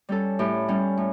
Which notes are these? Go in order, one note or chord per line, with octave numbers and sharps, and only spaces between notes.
G3 C#4 A4
A2 G4
G3 C#4
A2